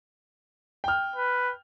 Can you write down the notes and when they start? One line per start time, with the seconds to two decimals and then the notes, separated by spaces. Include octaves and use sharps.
0.84 G5 F6
1.16 B4